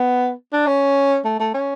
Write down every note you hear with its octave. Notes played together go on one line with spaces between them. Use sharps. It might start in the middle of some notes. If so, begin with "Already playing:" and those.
Already playing: B3
D4
C#4
A3
A3
C#4